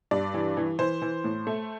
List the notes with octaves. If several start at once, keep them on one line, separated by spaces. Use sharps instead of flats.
G2 D5
E3
E3
E3 C5
E3
A2
A3